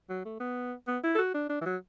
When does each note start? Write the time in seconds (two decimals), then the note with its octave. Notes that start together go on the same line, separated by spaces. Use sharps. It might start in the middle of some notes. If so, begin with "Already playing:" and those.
0.09 F#3
0.25 A3
0.40 B3
0.87 B3
1.04 E4
1.15 A4
1.18 F#4
1.34 D4
1.49 D4
1.61 E3
1.66 F#3